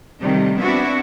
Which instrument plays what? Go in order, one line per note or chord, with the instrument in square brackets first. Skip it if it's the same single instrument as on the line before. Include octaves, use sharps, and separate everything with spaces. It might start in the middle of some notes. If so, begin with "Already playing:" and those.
[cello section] C3 D#3 G3 A3
B3 C4 D4 E4 F#4